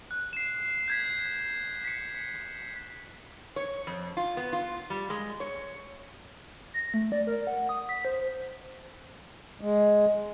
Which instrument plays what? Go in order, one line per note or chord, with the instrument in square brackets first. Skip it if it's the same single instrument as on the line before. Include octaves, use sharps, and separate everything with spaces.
[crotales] F#6
C7 E7
G6 G#6 B6
B6 C#7
[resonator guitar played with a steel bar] C#5
F2
F4
B3
F4
G3
G#3
C#5
[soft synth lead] A#6
A3
D5
A#4
F#5
D#6
B6
C5
[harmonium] G#3